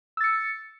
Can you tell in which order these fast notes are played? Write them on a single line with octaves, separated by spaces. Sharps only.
E6 A6 C#7